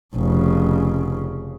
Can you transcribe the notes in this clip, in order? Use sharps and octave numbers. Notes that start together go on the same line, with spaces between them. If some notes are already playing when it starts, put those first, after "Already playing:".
F1 C#3